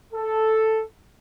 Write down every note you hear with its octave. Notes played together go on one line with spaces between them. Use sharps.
A4